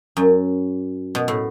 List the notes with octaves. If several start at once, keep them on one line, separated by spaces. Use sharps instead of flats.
F#2
B2
A2